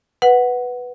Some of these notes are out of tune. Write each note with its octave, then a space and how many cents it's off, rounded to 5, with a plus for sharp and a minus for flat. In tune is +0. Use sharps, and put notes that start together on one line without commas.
B4 +0 F#5 +0